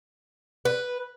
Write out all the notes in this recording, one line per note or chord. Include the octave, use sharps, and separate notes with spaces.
B4